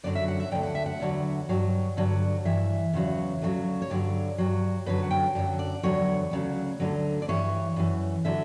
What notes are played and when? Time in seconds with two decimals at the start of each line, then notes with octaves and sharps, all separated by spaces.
0.04 F#2 D3 F#3 D5
0.15 E5
0.28 F#5
0.40 E5
0.52 D2 D3 F#3 G5
0.63 F#5
0.75 E5
0.86 F#5
1.00 E2 D3 F#3
1.49 G2 F#3
1.97 G2 D3 F#3
2.45 G2 E3 E5
2.93 E2 C#3 F#3
3.42 D2 C#3 F#3
3.82 C#5
3.90 G2 D3 F#3 D5
4.38 G2 F#3
4.86 F#2 D3 F#3 B4
5.03 F#5
5.11 G5
5.35 F#2 D3 F#3
5.59 D5
5.83 E2 D3 F#3 C#5
6.31 D2 C#3 F#3
6.80 D2 D3 F#3
7.22 D5
7.28 G2 E3 C#5
7.76 F#2 E3
8.25 D3 F#3 E5